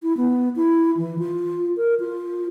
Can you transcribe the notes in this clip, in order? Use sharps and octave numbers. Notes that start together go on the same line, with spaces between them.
E4
B3
E4
E3
F4
A#4
F4